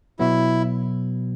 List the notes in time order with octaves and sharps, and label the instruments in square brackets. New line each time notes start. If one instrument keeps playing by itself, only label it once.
[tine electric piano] B2 F#3 B3 [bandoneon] E4